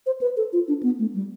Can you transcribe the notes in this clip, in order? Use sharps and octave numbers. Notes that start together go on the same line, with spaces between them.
C5
B4
A4
F4
D4
B3
A3
G3